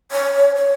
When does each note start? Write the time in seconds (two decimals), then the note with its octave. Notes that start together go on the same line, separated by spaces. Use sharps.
0.12 C#5
0.56 C#5